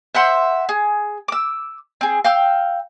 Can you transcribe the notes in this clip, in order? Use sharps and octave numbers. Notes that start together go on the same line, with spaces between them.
C5 E5 F#5 C6
G#4
D6 E6
C4 G#4
F5 G5 E6